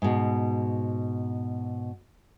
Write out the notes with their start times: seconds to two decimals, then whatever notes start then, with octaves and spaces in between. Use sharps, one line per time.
0.02 G#2 B2